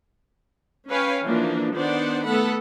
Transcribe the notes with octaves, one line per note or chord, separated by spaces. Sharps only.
C#4 B4 C#5 F5 G5 G#5
D3 E3 F3 A#3 D4
D#3 B3 D4 C5 D5 F#5
A3 B3 A4 F#5 B5